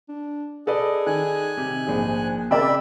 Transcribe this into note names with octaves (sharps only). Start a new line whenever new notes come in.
D4
G#4 A4 B4 D5 D#5
D#3 G#5 F#6
C3
A#1 G#2 G#4
C#3 C4 A#4 D5 E5 G5 B5 E6